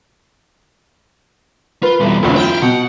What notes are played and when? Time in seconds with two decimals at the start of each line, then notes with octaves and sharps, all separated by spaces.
1.82 F4 A#4 B4
2.00 F1 B2 E3 G3
2.23 D2 B2 F#3 E4 F4
2.36 G5 F6
2.62 B2 F#5